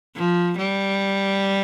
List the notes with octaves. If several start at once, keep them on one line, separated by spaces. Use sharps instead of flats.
F3
G3